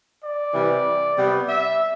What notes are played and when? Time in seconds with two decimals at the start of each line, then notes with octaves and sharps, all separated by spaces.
0.22 D5
0.53 C3 E3 G3
1.17 C3 G3 B3
1.49 E5